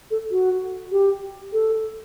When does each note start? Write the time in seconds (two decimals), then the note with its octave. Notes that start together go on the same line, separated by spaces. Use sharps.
0.11 A4
0.31 F#4
0.92 G4
1.53 A4